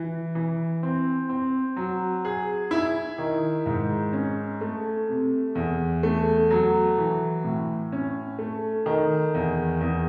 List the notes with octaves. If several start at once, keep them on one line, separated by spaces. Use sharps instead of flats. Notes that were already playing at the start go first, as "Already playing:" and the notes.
Already playing: E3
E3
C4
C4
F#3
G#4
E4
D#3
G#2
C#4
A3
C3
E2
A3
F#3
E3
A2
C#4
A3
D#3
E2
E2